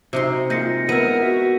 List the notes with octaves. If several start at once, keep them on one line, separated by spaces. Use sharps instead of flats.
C3 D#4 F#4 C6
G#3 A#3 F4 G6 A#6 C#7
B3 E4 A#4 D#7
F#4 E5